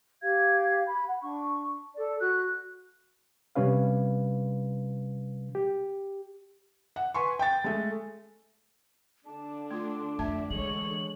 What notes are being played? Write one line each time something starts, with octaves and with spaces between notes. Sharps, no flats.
G4 F5 G#6
B5
F#5
D4 C#6
A4 D5
F#4 F#6
C3 G3 C#4 B4 F5
G4
F#5
B4 G#5 C6 C#6
G5 A6
G#3 A3
D3 D4 A5
A3 F4 C6
F2 A3 E5 A5
D3 E3 G#3 C#5 F#7